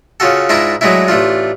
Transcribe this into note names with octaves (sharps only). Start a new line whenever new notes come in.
C#3 F4 F#4 A4
G#2 D4 E4 F4 A5 A#5
F#3 G#3 A3 D4 E4
A1 A3 D4 F4